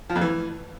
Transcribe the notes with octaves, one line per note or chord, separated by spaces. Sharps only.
F3
F2
E3